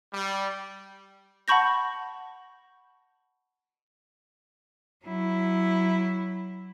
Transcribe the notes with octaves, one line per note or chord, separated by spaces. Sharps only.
G3
F#5 A5 B5 C#6 G6 A#6
F#3 E4